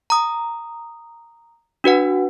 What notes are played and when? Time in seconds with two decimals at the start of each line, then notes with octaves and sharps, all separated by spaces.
0.10 A#5 D#6
1.84 D4 F#4 B4 F#5